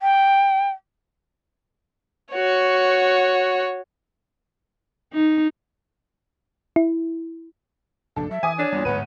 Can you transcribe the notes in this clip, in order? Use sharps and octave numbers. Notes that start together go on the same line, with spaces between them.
G5
F#4 C#5
D#4
E4
F1 A#1 G2 D4 A4
F#3 E5
E3 G#5 D6 D#6
D4 C#5
E2 A#2 G3
D1 G1 G#2 B4 F#5 D#7